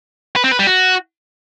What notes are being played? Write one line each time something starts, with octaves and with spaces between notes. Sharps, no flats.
B4
C4
B4
G3
F#4